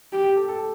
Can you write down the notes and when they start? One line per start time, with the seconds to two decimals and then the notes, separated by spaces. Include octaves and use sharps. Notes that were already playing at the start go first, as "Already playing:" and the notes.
0.13 G4
0.25 G4
0.36 A4
0.48 A4